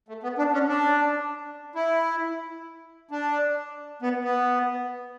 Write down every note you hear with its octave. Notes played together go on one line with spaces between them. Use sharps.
A3
B3
D4
C#4
D4
E4
D4
B3
B3